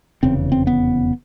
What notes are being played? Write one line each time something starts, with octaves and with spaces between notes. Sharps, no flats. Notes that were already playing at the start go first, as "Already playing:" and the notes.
F1 E2 C#3 C4
C4
B3